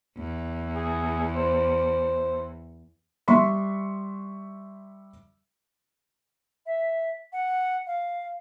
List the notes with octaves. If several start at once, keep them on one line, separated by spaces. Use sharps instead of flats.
E2
G#4
C5
G3 E5 C6 C#6 B6
E5
F#5
F5